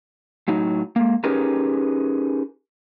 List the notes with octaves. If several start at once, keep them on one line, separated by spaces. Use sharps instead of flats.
A2 F#3 D#4
G#3 A#3
C#4 D#4 G4 G#4 A#4 B4